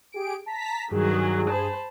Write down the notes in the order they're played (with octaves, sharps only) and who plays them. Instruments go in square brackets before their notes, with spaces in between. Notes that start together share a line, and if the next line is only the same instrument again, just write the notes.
[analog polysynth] G4 G#4 D7
A5 A#5 B6
[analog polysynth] G2 G#4 [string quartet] D#3 F#3
[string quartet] C5 A5 B5